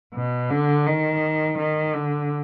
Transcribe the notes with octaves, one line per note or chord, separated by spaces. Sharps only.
B2
D3
D#3
D#3
D3